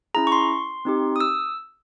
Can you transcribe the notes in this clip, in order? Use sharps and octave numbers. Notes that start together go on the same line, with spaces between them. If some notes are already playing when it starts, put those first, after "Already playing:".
C#4 E4 G#4 A#5
C#6
C6
C4 D#4 G4
D#6
E6